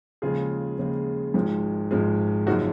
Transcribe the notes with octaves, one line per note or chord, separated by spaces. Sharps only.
D#2 C#3 F3 G#3 F4 G#4
D#2 C#3 F3 G#3
G#1 G#2 F3 G#3
G#1 G#2 F3 G#3
F#1 F#2 F3 G#3 D#4 F#4